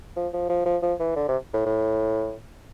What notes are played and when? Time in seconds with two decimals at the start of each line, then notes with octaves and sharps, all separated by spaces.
0.17 F3
0.33 F3
0.49 F3
0.66 F3
0.82 F3
1.00 E3
1.16 D3
1.28 C3
1.53 A2
1.66 A2